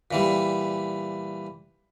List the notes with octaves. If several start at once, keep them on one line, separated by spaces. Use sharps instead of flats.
A#2 E3 G3